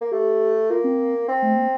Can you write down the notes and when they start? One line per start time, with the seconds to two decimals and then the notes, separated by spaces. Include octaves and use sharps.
0.01 A#3
0.11 A3 G4
0.70 A#3 F4
0.84 C4
1.28 C4
1.42 A3
1.57 A#3